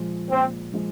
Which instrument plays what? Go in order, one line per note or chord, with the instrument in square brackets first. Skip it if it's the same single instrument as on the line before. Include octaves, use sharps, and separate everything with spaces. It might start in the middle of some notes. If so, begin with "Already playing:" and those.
Already playing: [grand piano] A#2 F3 G#3
[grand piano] A#2 [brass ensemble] C4
[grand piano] F3 G#3